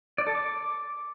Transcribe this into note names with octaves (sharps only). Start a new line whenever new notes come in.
D5
A4
D6